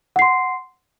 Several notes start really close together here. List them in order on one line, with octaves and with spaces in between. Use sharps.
F#5 C7 C6